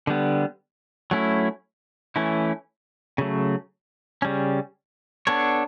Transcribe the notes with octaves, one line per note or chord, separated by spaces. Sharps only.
D3 G3 B3
F#3 A3 C#4 E4
E3 A3 C#4 E4
C#3 F#3 A3
C#3 G3 C#4
B3 D4 A4 C#5